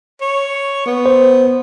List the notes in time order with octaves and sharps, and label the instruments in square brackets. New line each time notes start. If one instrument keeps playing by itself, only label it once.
[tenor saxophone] C#5
B3
[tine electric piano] C5